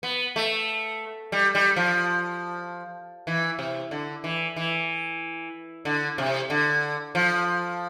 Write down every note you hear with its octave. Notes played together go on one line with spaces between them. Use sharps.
B3
A3
G3
G3
F3
E3
C3
D3
E3
E3
D3
C3
D3
F3